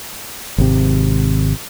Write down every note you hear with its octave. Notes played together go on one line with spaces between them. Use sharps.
G#1 C3